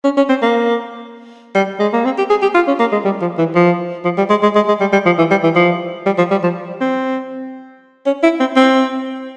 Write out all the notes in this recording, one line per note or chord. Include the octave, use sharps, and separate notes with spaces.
C#4
C#4
C4
A#3
G3
G#3
A#3
C4
G4
G#4
G4
F4
C#4
A#3
G#3
G3
F3
E3
F3
F3
G3
G#3
G#3
G#3
G#3
G3
G3
F3
E3
G3
E3
F3
G3
F3
G3
F3
C4
C#4
E4
C4
C4